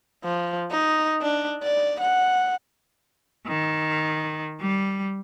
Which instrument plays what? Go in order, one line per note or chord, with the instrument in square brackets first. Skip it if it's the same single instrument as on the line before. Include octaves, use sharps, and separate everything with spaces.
[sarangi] F3
D#4
D4
D5
F#5
[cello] D#3
G3